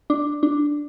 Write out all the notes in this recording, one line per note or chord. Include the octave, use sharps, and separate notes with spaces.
D4
D4